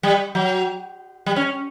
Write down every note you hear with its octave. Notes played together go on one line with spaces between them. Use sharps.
G3
F#3
G3
C#4